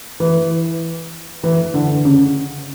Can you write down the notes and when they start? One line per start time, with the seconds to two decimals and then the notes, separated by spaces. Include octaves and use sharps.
0.20 E3
1.44 E3
1.74 D3
2.05 C#3